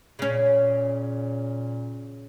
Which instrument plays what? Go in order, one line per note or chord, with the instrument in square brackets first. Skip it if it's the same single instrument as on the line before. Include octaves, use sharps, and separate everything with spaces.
[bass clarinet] A#2 [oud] C#3 C#4